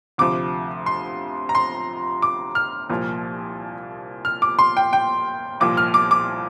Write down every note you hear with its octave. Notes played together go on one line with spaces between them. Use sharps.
D2 C3 F3 D6
C6
A#5
C6
D6
F6
C2 A#2 F3
F6
D6
C6
G5
G5
C2 A#2 F3 D6
F6
D6
D6